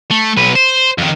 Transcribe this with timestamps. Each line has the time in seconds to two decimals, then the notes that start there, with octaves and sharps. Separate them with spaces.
0.11 A3
0.37 B1 B4
0.55 C5
0.98 F2 D#3